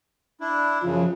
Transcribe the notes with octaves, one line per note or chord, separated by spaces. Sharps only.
D4 E4
F#2 C#3 F3